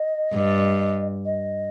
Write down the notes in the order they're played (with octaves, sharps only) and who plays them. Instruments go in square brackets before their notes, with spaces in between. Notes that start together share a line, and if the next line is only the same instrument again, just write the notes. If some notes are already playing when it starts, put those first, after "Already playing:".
Already playing: [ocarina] D#5
[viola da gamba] G2
[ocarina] D#5